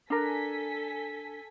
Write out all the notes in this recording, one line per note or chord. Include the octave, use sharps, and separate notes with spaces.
D4 A4 A#4 G#5 B6